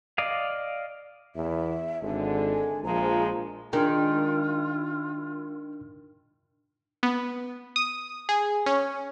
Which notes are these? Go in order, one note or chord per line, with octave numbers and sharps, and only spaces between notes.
D5 D#5 F5
E2 E5
G#1 D3 G#3
G#5
A#1 F3 G#3 A#5
D#3 G#3 D4 F4 A#4 G5
B3
D#6
G#4
C#4